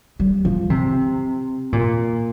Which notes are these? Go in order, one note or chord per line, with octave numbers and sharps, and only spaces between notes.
G3
F3
C3
A#2